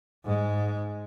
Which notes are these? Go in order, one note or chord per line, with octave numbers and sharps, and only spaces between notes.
G#2 G#3